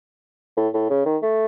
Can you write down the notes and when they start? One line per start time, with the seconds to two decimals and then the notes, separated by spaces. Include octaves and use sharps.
0.57 A2
0.74 A2
0.90 C#3
1.06 D#3
1.22 A3